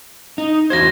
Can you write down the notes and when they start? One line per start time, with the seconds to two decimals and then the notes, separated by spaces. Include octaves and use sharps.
0.38 D#4
0.70 E2 F#4 C5 G#6 A#6